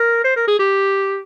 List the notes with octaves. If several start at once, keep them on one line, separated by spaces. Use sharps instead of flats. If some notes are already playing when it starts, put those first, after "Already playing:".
Already playing: A#4
C5
A#4
G#4
G4